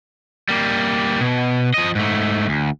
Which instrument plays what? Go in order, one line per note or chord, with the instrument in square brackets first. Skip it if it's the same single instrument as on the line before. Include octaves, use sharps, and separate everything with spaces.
[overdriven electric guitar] G3 A#3
B2
F3 D#5
G#2 A3
D2